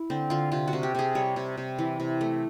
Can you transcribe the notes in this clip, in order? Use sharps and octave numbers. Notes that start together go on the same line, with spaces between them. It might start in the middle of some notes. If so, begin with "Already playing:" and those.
Already playing: E4
D3 C4
D3 F4
C3 F4
F#4
C3
G4
C3 G#4
G3 C#5
C3
C3
E3
C3
A3